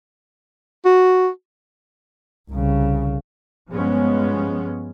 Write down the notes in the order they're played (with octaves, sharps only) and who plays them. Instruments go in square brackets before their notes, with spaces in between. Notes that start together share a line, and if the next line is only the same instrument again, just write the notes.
[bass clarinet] F#4
[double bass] C2 C#3
[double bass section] G2 F3 G#3 B3 C#4